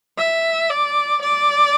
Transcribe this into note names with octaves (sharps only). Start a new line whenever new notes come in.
E5
D5
D5